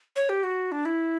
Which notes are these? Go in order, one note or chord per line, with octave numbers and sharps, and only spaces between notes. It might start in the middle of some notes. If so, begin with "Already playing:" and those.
C#5
G4
F#4
D4
E4